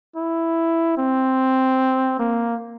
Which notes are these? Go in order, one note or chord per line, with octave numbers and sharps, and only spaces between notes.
E4
C4
A#3